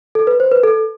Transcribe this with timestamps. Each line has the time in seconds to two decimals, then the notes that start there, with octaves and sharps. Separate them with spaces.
0.15 A4
0.27 B4
0.40 C5
0.52 B4
0.64 A4